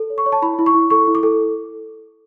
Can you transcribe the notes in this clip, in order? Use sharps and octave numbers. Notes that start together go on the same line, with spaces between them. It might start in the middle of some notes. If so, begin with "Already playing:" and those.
Already playing: A4
C#5
C#6
C#5
A5
E4 B5
E4
C#6
E4
A4 C#6
E4
D6
A4